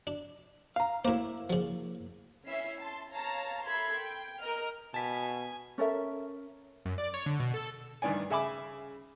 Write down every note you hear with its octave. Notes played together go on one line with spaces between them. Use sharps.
D4
F5 A#5
A2 A#3 E4 C5
C#3 F3
C#4 E4 E5 C7
A5 C6
C#5 F5 A5 A#5
A4 A#4 E5 B5 C6 G#6
G5
A#4 D#5 A#5 F6
B2 G#5 A5 B6
C#4 A4 A#4 E5
F#2
D5
C#5
D3
B2
A4
G2 D#3 E3 D5 G#5
C#3 E5 G#5 B5 D6